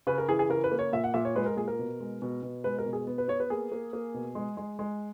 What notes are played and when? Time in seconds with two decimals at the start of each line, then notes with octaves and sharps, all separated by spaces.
0.07 C#3 B4
0.18 A#4
0.29 E3 G#4
0.39 G#4
0.50 C#3 A#4
0.64 B4
0.72 A#3
0.79 C#5
0.93 A#2 E5
1.04 F#5
1.14 A#2 E5
1.25 C#5
1.36 G#3 B4
1.46 A#4
1.57 A#2 G#4
1.68 A#4
1.79 B2
2.00 G#3
2.22 B2
2.43 B2
2.64 G#3 B4
2.78 A#4
2.86 B2
2.93 G#4
3.07 B3
3.18 B4
3.28 B3 C#5
3.40 B4
3.50 A#3 G#4
3.72 A#3
3.93 A#3
4.14 B2
4.35 G#3
4.57 G#3
4.79 G#3